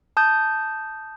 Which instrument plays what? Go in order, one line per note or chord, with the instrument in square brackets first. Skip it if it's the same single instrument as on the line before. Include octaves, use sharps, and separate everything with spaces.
[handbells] A5 D#6 G6